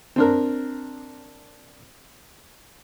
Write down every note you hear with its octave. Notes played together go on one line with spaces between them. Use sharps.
C4 D4 A#4